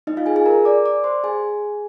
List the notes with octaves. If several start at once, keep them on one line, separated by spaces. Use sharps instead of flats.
D#4 D#5
F4 F5
G#4 G#5
G#4 G#5
A#4 A#5
D5 D6
D5 D6
C5 C6
G#4 G#5